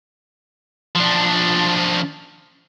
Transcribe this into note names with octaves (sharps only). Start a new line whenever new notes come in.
F3 D4